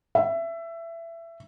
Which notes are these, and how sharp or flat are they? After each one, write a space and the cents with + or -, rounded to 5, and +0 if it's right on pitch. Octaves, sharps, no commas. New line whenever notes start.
E5 +20